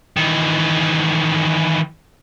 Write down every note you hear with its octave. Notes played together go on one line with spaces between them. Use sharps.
D#3 E3